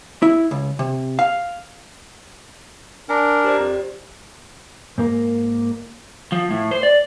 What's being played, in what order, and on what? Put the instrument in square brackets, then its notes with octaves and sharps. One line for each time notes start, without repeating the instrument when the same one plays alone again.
[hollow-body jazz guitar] E4
C#2
C3
F5
[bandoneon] D4 A#4 [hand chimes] G#5
[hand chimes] G4 C5 D5
[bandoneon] F2
[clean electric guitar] G#2 A#3 A#4
[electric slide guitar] F3
A2
C5
D5